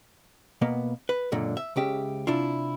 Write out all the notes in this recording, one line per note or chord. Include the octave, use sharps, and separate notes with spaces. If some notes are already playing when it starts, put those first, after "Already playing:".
B2 A#3 B3
B4
C#2 F#2 A#2 D3
E5
C#2 C#3 G4 E5
C3 D4 E4 F4